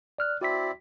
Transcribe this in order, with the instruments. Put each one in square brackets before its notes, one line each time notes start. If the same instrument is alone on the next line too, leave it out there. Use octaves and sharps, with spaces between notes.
[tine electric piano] D5 F6 F#6
[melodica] C4 E4 D5 [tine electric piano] F#4 B6